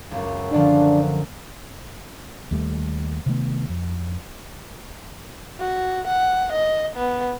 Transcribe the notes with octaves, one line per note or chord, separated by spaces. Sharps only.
C#2 F#2
F#2 D3 F3 D4
D#2 G3 A3
C3 D#3 A3 B3
F2
F#4
F#5
D#5
B3